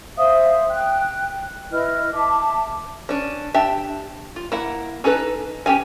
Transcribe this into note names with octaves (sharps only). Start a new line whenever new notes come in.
C5 E5 F5 D#6
G5 F#6
E4 B4 D#5 F6
E5 A5 D6
C#4 D4
D4 G4 E5
F4
A#3 E4 F#5
C#4 D#4 A4 B4
C#4 G4 G#4 G#5